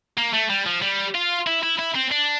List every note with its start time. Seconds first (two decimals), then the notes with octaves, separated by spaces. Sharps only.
0.17 A#3
0.33 A3
0.50 G3
0.66 F3
0.82 G3
1.15 F4
1.47 E4
1.63 E4
1.79 E4
1.95 C4
2.12 D4